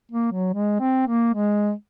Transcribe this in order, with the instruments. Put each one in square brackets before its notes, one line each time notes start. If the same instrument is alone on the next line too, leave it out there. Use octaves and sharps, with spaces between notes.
[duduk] A#3
F#3
G#3
C4
A#3
G#3